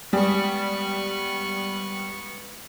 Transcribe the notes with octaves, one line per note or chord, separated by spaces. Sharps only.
G3 G#3 B3 C#6